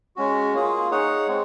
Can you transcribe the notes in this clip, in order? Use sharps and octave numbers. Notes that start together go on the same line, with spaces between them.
G#3 C#4 F#4
A#3 F4 G#4
D#4 G#4 C#5 F#5
G#3 C4